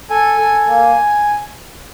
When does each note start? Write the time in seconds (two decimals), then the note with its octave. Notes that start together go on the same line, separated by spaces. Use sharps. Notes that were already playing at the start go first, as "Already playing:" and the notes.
0.10 A4 G#5
0.38 A4
0.67 A#3